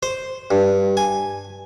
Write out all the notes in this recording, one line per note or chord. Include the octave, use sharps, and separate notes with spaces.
C5
G2
G#5